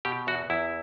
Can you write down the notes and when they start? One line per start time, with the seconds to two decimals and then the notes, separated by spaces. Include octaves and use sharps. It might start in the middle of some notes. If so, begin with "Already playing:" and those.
0.05 B2 G4
0.27 E2 F#4
0.50 E2 E4